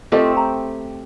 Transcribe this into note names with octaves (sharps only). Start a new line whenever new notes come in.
A3 C4 F4 G4 A4 D#5
A#5